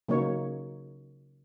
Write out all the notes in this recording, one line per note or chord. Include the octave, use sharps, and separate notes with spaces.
C#3 F#3 A#3 D#4 C#5